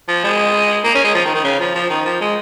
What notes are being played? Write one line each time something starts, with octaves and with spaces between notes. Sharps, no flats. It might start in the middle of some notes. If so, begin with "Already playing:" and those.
F3
G#3
A#3
C#4
G#3
F3
D#3
D#3
C#3
F3
F3
D#3
F3
G#3